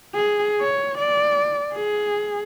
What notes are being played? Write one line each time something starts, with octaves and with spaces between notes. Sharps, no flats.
G#4
C#5
D5
G#4